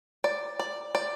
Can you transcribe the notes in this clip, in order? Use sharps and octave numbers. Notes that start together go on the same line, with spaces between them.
D5
D5
D5